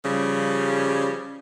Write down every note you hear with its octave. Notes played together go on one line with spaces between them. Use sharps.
C#3 F3 G3